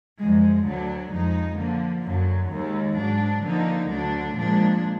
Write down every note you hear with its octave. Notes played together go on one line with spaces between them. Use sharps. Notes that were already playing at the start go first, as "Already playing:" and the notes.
F#2 F3 G#3
D2 D3 F#3 D4
F2 F3 G#3 D#4
D3 F3 A#3
F#2 D3 F#3
D#2 D#3 G#3
G#2 F#3 D4
D3 F3 A#3 D#4
D2 D3 F#3 D4
A#2 F3 G#3 D4